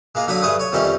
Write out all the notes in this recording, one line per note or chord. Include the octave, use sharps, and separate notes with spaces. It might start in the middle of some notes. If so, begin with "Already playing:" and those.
G#3 A#3 F4
D3 F#3 D4 B5 D#6
G2 A3 G#4 B4 D#6
C#5
F2 D#3 G3 A3 C#4 C6